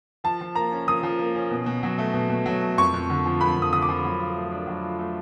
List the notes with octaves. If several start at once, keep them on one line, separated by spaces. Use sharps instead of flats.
F3 A5
F3
A#3 A#5
C#4
F3 D#6
F3
A#3
C#4
B2
B2
F#3
A3
B2
B2
F#3
A3
F2 C#6
F2
D3
F3
F2 B5
F2
D#6
D3 D#6
D6
F3
F#3
F4
A3
D4
F#3
F4
A3